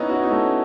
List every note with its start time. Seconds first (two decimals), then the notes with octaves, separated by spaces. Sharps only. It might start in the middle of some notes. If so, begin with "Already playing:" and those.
Already playing: B3 C#4 D#4 E4
0.09 F#4
0.16 E4
0.23 D#4
0.31 A3 C#4